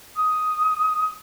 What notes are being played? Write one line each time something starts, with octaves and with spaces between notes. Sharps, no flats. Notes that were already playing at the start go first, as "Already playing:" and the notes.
D#6